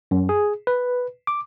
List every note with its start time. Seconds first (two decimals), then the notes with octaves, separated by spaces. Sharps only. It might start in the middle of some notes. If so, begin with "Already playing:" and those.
0.11 F#2
0.29 G#4
0.67 B4
1.27 D6